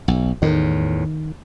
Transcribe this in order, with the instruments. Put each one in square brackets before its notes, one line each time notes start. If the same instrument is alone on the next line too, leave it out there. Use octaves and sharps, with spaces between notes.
[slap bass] B1
[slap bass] E2 A2 [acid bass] D#3